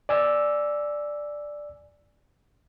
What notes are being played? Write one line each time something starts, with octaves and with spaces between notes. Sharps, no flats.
D5 G#5 E6